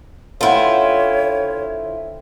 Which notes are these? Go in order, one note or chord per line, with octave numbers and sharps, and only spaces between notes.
D3 E4 F4 C5 C#5 G5